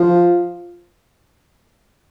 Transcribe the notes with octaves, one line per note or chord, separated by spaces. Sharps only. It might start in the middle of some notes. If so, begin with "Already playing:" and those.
Already playing: F3